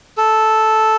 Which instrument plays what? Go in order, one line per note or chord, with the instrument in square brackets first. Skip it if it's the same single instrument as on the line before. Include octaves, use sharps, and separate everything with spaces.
[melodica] A4